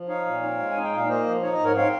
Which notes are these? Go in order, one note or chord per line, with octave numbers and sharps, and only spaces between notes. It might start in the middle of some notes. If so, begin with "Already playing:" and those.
Already playing: F3
D#4 C#5 F5
A#2
C4
G#3
D#4 G#5
G5
A#2 F5
A#3 C5 D#5
F3
D#4 C#5
D#5
G#2
A#4 C#5
C4 C#5 F5